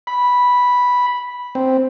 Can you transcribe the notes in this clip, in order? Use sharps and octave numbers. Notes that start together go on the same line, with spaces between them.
B5
C4